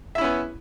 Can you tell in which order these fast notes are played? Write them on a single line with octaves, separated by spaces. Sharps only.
E5 E4 C#4 B3